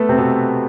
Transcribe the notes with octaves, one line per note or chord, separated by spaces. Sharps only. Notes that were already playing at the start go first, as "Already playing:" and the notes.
Already playing: A3 B3 A4 B4
C3 C4
B2 B3